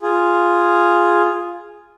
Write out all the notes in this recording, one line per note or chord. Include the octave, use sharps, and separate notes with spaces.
F4 G#4